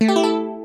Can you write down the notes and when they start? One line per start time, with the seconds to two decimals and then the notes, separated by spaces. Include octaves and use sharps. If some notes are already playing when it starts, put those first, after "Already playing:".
0.01 A3
0.08 G4
0.16 E4
0.23 A4